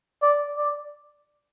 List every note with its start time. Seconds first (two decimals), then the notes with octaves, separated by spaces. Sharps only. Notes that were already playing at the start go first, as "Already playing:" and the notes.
0.22 D5
0.57 D5